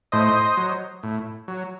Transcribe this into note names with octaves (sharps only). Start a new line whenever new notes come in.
A2 C5 D#5
F#3
A2
F#3